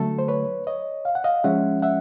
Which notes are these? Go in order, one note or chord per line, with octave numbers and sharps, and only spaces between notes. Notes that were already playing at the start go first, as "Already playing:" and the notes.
Already playing: D3 F#3 A3 A4
C5
B4 C#5
C#5 D#5
F5
F#5
D#5 F5
F3 G#3 C#4 E5 F#5
E5 F#5